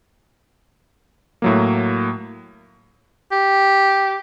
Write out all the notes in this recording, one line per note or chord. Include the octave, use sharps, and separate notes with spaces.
A2 F#3 A#3
G4